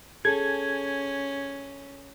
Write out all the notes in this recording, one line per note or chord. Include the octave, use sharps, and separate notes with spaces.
C#4 G#4 A4 G#6